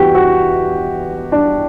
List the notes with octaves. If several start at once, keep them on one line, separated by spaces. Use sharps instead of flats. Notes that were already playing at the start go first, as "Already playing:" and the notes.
Already playing: E2 E3 F#4 G4
F#4
D4